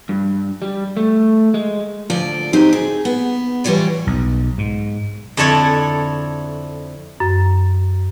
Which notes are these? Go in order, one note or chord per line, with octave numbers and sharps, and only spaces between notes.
G2
G3
A3
G#3
D2 F3 F4 D5
F#3 C4 D#4 G4 C5
G#4
B3
E3 G3 F4 C#5 D5
B1
G#2
F2 D3 E4 A4 C#5 D5
F#2